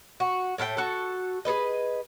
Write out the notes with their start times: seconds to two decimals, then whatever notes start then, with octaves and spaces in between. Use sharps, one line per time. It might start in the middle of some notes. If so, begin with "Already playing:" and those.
0.20 F#4
0.58 A2 A3 E4 G5
0.77 F#4 A4
1.45 G#4 A4 B4 D#5